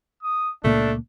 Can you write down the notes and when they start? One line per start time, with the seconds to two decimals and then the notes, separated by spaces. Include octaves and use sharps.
0.23 D#6
0.64 C#2 A#2 A3 A#3 D4